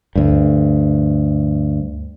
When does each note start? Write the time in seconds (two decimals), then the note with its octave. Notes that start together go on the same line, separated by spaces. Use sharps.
0.15 D2 G2